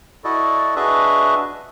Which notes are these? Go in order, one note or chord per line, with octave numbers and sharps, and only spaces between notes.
E4 F#4 A4 D5 D#5
D4 F#4 G#4 B4 D#5 E5